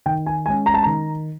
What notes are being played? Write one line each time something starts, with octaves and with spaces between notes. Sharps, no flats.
D#3 G5
G#5
G#3 C#4 G#5
A#5
A5
D#3 A#5